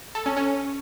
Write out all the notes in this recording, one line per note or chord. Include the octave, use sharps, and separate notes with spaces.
A4
C#4
C#4